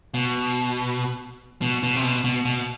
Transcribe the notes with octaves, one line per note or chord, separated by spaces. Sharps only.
B2
B2
B2
C3
B2
B2
B2